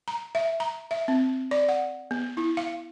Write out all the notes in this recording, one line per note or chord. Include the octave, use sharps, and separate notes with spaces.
A#5
E5
A#5
E5
C4
D5
F#5
B3
E4
F5